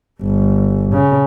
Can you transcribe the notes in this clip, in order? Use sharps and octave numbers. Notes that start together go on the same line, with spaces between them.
G1
C#3